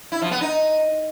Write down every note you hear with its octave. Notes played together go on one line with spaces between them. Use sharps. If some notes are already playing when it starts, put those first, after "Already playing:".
E4
F3
B3
D#4